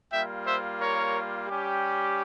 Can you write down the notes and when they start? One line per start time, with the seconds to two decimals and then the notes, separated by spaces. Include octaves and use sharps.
0.13 G3 A#3 F4 E5 G5
0.47 C5 E5
0.80 A#4 C#5
1.48 G3 C#4 G4